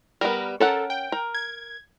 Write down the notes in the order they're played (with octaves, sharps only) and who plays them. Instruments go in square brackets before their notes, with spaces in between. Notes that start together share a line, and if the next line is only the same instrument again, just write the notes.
[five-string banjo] G3 B3 [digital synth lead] A#4
[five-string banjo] C#4 A#4 F#5 [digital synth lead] A4
[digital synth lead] G5
[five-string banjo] A#4
[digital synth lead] G#6